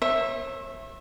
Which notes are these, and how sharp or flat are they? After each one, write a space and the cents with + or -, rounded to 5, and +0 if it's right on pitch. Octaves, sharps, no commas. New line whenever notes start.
C#5 -40 E5 +0